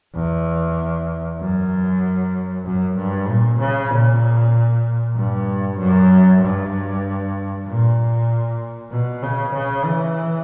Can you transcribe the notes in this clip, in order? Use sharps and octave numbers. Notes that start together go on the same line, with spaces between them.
E2
F#2
F#2
G2
A#2
C#3
A#2
G2
F#2
G2
A#2
B2
C#3
C#3
E3